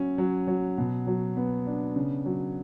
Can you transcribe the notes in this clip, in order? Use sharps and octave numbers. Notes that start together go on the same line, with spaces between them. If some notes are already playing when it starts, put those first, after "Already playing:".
Already playing: F#3 C#4
F#3
F#3
B2
F#3
B3
D4
C#3
F#3